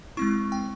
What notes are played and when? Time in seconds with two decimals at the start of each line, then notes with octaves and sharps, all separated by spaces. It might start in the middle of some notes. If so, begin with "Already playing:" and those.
0.17 G#3 C4 E4 C#6
0.52 G5